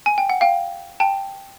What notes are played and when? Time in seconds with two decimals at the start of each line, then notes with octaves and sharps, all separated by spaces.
0.06 G#5
0.18 G5
0.29 F#5
0.41 F5 G5
1.00 G5 A5